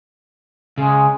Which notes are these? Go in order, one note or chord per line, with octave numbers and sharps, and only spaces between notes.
C#3 G#3